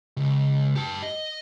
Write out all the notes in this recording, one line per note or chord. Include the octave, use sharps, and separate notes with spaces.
C#2
G4 A5
D#5